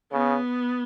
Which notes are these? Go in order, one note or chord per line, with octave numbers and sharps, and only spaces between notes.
C#3 B3